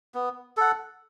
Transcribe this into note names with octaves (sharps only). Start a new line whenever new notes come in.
B3
A4 F#5